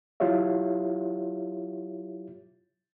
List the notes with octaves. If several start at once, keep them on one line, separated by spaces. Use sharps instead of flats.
F#3 E4 F4 G4 C#5 E5